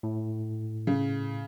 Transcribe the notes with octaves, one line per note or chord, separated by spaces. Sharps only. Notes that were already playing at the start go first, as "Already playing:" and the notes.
A2
C#3